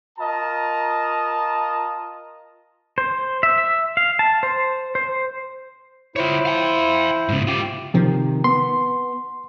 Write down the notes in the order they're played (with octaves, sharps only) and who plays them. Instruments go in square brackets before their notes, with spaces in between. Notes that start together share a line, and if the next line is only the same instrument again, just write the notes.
[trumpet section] F4 A#4 D#5 A5 A#5
[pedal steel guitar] C5
E5
E5
F5
A5
C5
C5
[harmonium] E4 C5 [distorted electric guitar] F4 C#5
[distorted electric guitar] F5 G5
G#2 C#3
F4 G4
[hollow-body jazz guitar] C3 D#3 [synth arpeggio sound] F3
[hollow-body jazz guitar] B3 [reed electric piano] C6